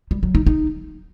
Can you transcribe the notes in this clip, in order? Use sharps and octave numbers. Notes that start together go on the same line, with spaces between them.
G3
F#3
D#4
D#4